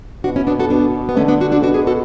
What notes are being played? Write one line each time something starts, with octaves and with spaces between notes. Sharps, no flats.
B2 D4 F#4
C#4 E4
B3 D4
F#4 A4
B3 D4
B3
D3 A3 C#4
B3 D4
D4 F#4
D4 F#4
B2 D4 F#4
G#4 B4
F#4 A4